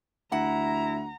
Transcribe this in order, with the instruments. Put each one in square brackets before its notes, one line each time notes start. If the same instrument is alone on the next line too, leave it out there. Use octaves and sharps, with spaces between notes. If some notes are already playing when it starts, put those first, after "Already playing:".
[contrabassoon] D2 [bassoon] E4 [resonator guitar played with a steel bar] F#5 [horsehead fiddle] A#5